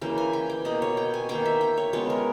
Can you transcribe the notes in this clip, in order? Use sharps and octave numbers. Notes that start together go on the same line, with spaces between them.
C#3 E3 A#3 G5
G#5
G5
G5
B2 A#3 D#5
C#5
G5
G#5
D#3 A#3 G5
E5
G5
C#5
C#3 G#3 B3 C#5
A#4